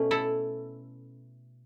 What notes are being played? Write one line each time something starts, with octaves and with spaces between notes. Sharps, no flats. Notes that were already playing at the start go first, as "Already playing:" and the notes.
Already playing: B2 A3 C#4
E4 A4